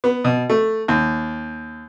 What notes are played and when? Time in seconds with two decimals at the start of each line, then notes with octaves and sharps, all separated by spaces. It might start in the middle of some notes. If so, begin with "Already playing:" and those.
0.04 B3
0.25 B2
0.50 A3
0.88 D#2